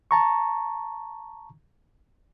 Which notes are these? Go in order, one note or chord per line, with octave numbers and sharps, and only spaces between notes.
A5 A#5 C#6